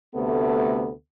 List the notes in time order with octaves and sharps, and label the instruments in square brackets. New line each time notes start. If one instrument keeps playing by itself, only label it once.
[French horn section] D2 C3 A3 B3 A4